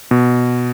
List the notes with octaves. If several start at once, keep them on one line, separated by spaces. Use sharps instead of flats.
B2